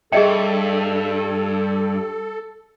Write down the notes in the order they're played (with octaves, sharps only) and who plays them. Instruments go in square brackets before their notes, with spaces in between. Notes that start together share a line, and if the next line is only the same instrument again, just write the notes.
[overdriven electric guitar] G2 [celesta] G#4 E5 [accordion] A4 [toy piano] D#5 G5